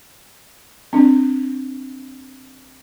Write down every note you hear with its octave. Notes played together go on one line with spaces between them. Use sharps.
C4 D4